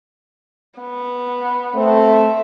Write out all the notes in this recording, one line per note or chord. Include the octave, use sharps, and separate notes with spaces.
B3
A3 C4
E5